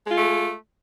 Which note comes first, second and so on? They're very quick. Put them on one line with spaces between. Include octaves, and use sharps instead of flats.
G#3 F4 A3